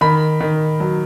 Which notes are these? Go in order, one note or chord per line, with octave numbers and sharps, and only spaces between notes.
D#3 B5
D#3
F#3